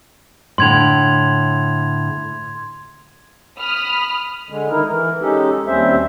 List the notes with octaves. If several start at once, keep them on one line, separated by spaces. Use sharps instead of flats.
A2 D3 C6 G#6 F7
B5 D#6 F6
D3 G#3
D#3 D#4 E4 A#4
E3 A#4
G#3 C#4 D#4 G4 A4
D#2 G3 C4 C#4 C5 E5